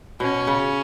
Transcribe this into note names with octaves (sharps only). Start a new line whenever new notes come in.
B2 C#4
C#3